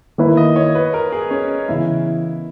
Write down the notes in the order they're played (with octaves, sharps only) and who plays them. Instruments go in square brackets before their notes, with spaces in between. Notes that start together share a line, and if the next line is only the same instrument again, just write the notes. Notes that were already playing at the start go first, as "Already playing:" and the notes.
[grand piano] D#3 A#3 E4 B4
[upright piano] D#5
C#5
B4
A#4
G#4
C#4
[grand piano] C#3 E3 B3 [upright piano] E4